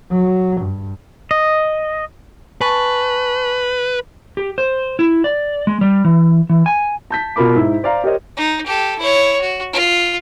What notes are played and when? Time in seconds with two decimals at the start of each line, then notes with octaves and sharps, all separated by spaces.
0.12 F#3
0.62 G2
1.31 D#5
2.61 B4 G#5 A5 C#6
4.37 G4
4.58 C5
4.99 E4
5.24 D5
5.67 G#3
5.81 G3
6.05 E3
6.49 E3
6.66 G#5
7.11 A5 G6 B6
7.36 B2 F4 A#4 B5 D6
7.55 G#2 E4 E5
7.83 C5 D5 F5 A#5
8.04 G4 A#4 C5 C#5 D#5
8.37 D#4
8.66 G4 A4
8.99 E4 C#5
9.41 F#4
9.73 F4